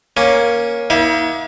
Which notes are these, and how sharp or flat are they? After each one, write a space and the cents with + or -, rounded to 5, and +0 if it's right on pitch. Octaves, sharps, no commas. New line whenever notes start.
A#3 +10 C#4 +0
A#3 +40 E4 -45 E5 +40